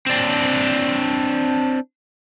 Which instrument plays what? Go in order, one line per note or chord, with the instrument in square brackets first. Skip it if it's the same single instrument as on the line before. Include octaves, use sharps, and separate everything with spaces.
[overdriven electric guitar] C4 D4